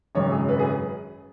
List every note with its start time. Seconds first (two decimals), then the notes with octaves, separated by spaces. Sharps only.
0.15 G#1 F#2 C#3 F#3 C#5
0.31 G#4
0.49 B4
0.59 G#4